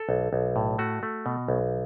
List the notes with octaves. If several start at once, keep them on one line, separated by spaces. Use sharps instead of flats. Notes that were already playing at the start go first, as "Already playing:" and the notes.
Already playing: A4
B1
B1
A2
A3 F#4
A3
B2
B1